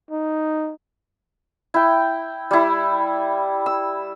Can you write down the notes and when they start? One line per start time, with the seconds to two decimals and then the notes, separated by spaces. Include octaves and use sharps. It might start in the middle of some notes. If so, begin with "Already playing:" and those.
0.11 D#4
1.74 E4 G5
2.51 G3 E4
3.66 E6